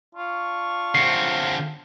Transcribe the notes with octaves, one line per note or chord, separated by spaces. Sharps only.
D4 F4 C#6
D3 C4 C7 C#7